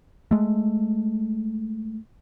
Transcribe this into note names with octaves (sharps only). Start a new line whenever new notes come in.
G#3 A3